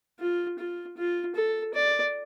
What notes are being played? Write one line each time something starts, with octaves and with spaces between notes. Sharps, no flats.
F4
F4
F4
A4
D5